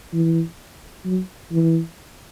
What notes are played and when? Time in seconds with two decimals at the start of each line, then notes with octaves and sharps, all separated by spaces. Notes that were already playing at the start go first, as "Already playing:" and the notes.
0.13 E3
1.05 F#3
1.52 E3